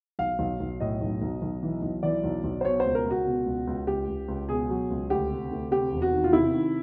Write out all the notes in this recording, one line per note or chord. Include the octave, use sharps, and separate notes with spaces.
B1 F5
B1
B1
A2 D#5
B1
B1
B1
E3
B1
E3 D5
B1
B1
C5
B2 C#5
C5
C#2
A#4
C#2
F#4
B2
C#2
C#2
C#2 G4
C#2
C#2
B2 G#4
F#3
C#2
D2 G4
C3
D2
C3 G4
E1
F#4
D#3
F4
C3 E4
D#3